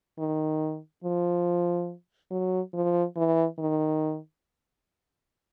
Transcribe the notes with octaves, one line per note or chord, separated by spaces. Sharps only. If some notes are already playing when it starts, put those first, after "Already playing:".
D#3
F3
F#3
F3
E3
D#3